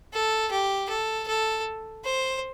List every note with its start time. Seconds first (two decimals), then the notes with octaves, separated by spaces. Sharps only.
0.13 A4
0.51 G4
0.90 A4
1.28 A4
2.05 C5